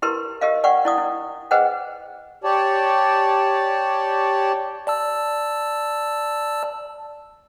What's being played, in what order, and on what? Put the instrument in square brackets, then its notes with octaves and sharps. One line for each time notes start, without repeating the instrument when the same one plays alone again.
[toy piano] E4 G4 A#4 B4 C6
G4 A#4 D#5 F5
D5 F#5 G5 C#6
E4 D5 D#6
E4
G#4 B4 C5 D#5 F#5 G5
[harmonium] G4 C#5 D5 A5
[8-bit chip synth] D5 A5 E6